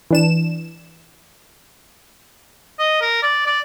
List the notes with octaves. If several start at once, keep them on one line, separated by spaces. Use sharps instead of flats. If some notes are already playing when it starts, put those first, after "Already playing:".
E3 D4 E7
D#5
A#4
D5
D5